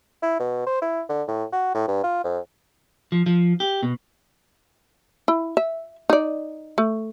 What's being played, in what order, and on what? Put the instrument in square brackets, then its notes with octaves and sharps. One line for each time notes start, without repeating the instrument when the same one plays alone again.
[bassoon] E4
B2
C5
E4
D3
A2
F#4
A2
G2
F4
F2
[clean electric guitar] F3
F3
G4
B2
[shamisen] E4
E5
D#4 D5
A3